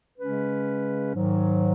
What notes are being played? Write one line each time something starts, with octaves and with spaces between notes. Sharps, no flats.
C#3 G#3 C#4 B4
G#2 D#3 F#3